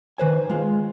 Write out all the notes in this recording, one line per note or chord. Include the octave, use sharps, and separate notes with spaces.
D#3 B4 C5 G#5
G#3 F4